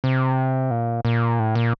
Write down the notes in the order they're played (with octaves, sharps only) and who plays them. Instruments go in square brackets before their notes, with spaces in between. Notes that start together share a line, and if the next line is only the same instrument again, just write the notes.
[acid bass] C3
A#2
A#2
A2
A#2